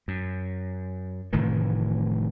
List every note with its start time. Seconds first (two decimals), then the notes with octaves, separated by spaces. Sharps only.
0.08 F#2
1.33 F1 A2 D#3 E3